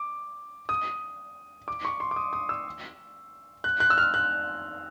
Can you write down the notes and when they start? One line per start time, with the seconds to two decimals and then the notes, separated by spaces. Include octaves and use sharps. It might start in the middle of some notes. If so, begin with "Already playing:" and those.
Already playing: D6
0.69 D#6
1.68 D6
1.85 C#6
2.00 C6
2.11 D6
2.16 D#6
2.33 D#6
2.49 E6
3.64 F#6
3.80 F#6
3.90 E6
3.98 F6
4.14 F#6